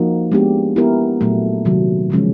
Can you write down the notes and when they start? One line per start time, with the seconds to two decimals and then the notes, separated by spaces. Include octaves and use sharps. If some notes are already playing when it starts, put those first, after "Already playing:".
Already playing: F3 A#3 D#4 F#4
0.32 G#3 B3 D4 G4
0.76 B3 E4 G4 A#4
1.21 A#2 F#3 A3
1.65 C3 D#3 F#3
2.10 C#3 F3 G#3 C#4